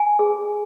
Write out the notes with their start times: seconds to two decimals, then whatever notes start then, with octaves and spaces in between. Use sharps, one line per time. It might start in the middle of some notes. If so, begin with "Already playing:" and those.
Already playing: G#5
0.19 G#4